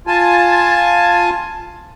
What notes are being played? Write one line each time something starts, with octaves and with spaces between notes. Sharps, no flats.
F4 G#5 A5